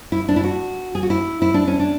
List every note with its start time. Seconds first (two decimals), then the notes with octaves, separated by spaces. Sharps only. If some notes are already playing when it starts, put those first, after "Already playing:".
0.12 E4
0.29 D4
0.36 E4
0.44 F#4
0.95 G#4
1.03 F#4
1.10 E4
1.42 E4
1.54 D4
1.67 C#4
1.79 D4